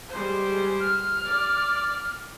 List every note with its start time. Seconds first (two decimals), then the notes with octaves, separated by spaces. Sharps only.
0.11 G3 G#3 C5
0.80 F6
1.25 D5